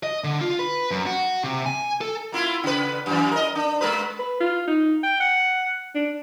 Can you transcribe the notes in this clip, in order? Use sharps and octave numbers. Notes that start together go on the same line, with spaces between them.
D#5
D3
F4
B4
F#2
F#4
C3
G#5
A4
A#3 E4 F4
C#3 B4
F#2 E3
A#4 D#5
D4
G#3 A#4 B4
B4
F4
D#4
G5
F#5
D4